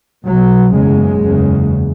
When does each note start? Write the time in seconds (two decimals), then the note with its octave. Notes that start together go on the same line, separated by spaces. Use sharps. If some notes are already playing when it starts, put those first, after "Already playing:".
0.25 B1 B2 F#3
0.73 F#1 E2 C#3 G#3
1.22 F#1 E2 C#3